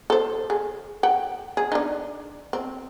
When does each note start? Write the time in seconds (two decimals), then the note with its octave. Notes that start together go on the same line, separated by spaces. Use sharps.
0.10 A4 C5
0.50 G#4
1.03 F#5 G5
1.57 G#4
1.72 D4 D#4
2.53 C4